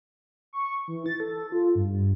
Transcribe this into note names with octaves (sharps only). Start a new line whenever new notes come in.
C#6
E3
A6
A4
F4
G2